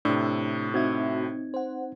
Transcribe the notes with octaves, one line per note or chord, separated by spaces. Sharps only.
A2 C3 D4 E6
C4 D#4 F#4 E5 G#6
C5 F#5